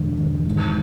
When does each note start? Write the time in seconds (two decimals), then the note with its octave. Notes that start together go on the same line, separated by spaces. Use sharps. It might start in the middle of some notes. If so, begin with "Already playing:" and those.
Already playing: E1 D3
0.17 E1
0.46 G#1